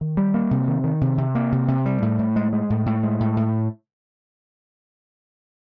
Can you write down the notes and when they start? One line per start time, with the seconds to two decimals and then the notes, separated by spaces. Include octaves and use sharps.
0.01 D#3
0.17 G3
0.34 A#3
0.51 C3
0.68 D#3
0.84 D#3
1.01 C3
1.18 C3
1.35 A#3
1.52 C3
1.68 C3
1.86 G3
2.02 A2
2.19 A2
2.36 G#3
2.53 G#3
2.70 A2
2.86 A2
3.03 G#3
3.20 A2
3.37 A2